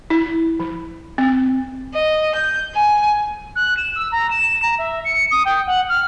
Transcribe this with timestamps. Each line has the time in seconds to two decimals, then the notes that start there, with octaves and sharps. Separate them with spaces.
0.10 E4
0.60 F3
1.18 C4
1.92 D#5
2.35 G6
2.75 G#5
3.56 F#6
3.77 E7
3.96 E6
4.12 A#5
4.30 E7
4.62 A#5
4.78 E5
5.05 C#7
5.31 D#6
5.45 G5
5.67 F#5
5.89 F6